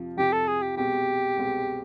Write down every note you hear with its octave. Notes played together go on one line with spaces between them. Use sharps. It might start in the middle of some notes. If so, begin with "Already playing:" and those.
Already playing: F2 C3 F3
F2 C3 F3 G4
A4
G#4
G4
C2 B2 G#3 C4 G4
C2 B2 G#3 C4